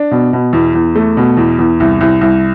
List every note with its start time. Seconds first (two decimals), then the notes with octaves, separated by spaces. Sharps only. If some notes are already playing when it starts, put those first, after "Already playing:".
Already playing: D4
0.11 B2
0.33 B2
0.53 E2
0.75 E2
0.96 A3
1.17 B2
1.37 E2
1.59 E2
1.80 C2
2.01 C2
2.21 C2